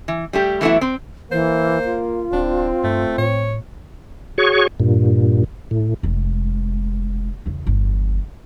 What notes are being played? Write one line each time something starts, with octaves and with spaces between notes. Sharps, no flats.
E3
G3 A3 G4
E3 F#3 A3 B3 E4
C4
E3 A#3 C5
F4
D1 C4 D4
G2 A3
A2 C#5
F#4 G#4 C#5 C#6
G2 A#2
A2
F1 G#3
E2 C#3
G1 E2